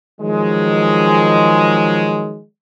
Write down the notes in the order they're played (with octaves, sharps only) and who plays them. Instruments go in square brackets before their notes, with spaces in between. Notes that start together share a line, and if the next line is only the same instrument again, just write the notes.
[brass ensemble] D#3 F3 F#3 G#3